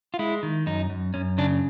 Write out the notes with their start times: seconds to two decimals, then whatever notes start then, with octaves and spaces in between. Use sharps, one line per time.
0.14 F4
0.19 G#3 E4
0.43 D#3
0.66 F#2 D#4
0.90 F#2
1.14 F#2 C#4
1.38 C#3 D4